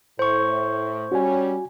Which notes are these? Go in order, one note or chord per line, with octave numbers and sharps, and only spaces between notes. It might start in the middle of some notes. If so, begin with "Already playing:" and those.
A2 C5 C#6
G3 C#4 F#4 G#5